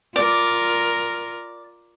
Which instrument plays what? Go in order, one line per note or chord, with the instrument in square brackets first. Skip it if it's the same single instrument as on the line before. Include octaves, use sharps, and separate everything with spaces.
[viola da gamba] F4 A#4 [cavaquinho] D5